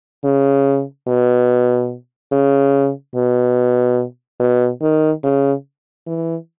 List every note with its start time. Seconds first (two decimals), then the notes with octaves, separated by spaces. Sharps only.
0.25 C#3
1.08 B2
2.32 C#3
3.15 B2
4.40 B2
4.82 D#3
5.24 C#3
6.07 E3